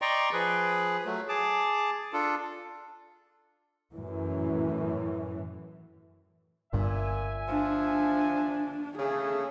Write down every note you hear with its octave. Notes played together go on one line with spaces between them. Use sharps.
D5 D#5 G5 A#5 C6 C#6
F3 G#4 B4
F#3 A3
G#4 A5 D6
D4 F4 A4
F#2 A2 E3
G1 G2 A#2 E5 G#5
F3 D4
C#3 A3 G#4